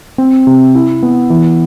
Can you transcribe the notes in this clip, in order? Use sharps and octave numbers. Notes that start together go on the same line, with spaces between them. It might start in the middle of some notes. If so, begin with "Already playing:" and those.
C4
C3
E4
B3
E3